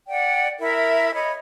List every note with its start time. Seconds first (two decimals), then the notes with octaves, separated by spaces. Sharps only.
0.08 D5 F#5 G5
0.59 E4 A#4 E5
1.15 C#5 D#5 B5